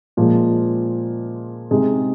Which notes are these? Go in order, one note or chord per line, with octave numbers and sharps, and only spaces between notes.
A#2 F3 G#3
C3 G#3 D#4 G#4